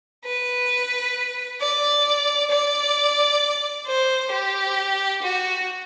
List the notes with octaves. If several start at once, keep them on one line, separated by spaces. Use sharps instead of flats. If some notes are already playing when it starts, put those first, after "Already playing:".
B4
D5
D5
C5
G4
F#4